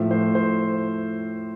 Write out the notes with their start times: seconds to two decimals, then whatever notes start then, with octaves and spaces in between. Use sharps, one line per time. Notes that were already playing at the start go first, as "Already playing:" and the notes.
Already playing: A2 F3 A3
0.11 C5
0.35 C5